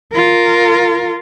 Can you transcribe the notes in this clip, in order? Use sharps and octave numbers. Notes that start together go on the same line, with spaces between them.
F4 A#4